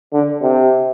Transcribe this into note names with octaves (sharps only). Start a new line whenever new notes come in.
D3
C3